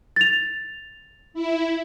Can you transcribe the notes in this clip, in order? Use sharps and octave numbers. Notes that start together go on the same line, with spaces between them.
A6 F7
E4